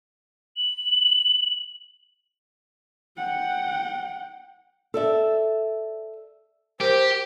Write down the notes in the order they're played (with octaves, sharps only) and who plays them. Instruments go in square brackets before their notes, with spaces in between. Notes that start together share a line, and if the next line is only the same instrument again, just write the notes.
[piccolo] F#7
[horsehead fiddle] F#5 G5
[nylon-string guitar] A4 D5 E5
[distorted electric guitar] G4 [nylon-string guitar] A#4 [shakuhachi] C5